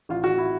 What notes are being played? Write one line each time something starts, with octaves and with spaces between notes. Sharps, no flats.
A1 F4
A1 F#4
E4